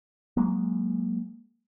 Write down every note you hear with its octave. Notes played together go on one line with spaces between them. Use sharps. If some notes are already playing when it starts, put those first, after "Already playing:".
F#3 G#3 A#3